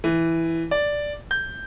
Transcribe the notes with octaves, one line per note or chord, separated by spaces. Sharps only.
E3
D5
G6